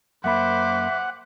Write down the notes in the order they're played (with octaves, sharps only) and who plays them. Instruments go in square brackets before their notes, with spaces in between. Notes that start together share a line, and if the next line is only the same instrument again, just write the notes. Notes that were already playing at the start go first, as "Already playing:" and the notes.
[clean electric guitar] F#2 A#3 B5 [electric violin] C5 D6 [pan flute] E5 [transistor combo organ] F#5